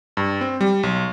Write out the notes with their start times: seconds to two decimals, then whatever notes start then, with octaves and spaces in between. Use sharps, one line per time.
0.17 G2
0.41 C4
0.61 G3
0.83 B1